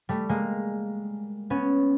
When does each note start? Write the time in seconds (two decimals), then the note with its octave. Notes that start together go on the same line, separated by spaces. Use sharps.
0.09 G3 A3
0.29 G#3 A#3
1.50 B3 C#4